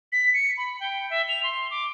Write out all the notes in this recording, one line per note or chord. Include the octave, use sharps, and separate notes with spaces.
B6
C#7
B5
G5
E5
F7
C6
D6